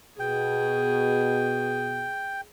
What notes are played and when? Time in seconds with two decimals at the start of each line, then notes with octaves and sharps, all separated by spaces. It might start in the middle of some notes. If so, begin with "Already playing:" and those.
0.20 B2 G#4 G5